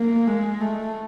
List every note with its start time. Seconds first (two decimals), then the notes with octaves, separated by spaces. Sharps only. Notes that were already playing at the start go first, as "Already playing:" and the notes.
Already playing: A#3
0.27 G#3
0.61 A3